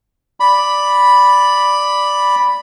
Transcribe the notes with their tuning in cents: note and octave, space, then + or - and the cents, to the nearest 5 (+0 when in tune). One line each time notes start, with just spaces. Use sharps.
D5 +0 B5 +0